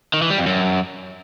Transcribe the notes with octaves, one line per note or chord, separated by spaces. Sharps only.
D#3
E3
G3
F2
F#2